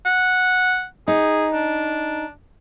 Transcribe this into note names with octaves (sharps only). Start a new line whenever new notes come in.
F#5
D#4 G#4
D4